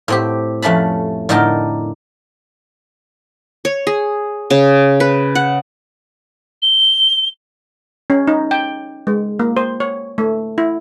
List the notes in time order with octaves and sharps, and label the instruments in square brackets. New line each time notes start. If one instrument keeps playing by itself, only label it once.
[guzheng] A2 C4 G4
F2 A3 C#4 A5 B5
A2 D3 D#4 A#4 G5 A5
[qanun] C#5
G#4
C#3
B4
F#5
[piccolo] G7
[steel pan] C#4
D#4
G5
G#3
A#3
C5
C#5
A3
E4